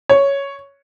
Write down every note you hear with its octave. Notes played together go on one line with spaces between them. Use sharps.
C#5